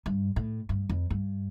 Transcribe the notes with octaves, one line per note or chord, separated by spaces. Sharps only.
G2
A2
G2
F2
G2